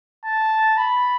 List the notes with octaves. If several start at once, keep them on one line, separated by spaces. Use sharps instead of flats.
A5
B5